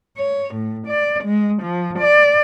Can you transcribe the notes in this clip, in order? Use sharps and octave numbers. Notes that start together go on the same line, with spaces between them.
C#5
A2
D5
G#3
F3
D5